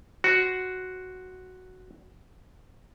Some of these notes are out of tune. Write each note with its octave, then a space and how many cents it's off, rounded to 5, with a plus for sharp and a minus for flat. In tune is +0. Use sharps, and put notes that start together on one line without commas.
F#4 +0 C5 +0